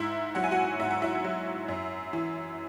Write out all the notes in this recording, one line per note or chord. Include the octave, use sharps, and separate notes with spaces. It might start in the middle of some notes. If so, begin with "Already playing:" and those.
Already playing: G#2 E4 E5
F#3 F#5
G#5
F#4 F#5
G#2 E5
F#5
E4 E5
F#3
F#2
E3